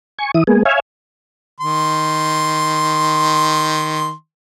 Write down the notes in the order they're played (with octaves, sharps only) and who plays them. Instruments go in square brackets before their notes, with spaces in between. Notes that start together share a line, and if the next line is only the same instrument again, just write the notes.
[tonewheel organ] G#5 C#6
E3 E4 D#6
G#3 A#3 B3 G#4
C#5 E5 F5 G#5
[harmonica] D#3 C6